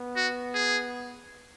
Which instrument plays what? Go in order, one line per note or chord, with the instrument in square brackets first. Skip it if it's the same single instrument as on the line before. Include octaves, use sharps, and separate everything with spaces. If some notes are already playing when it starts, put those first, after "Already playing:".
Already playing: [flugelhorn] B3
[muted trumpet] F#4
G#4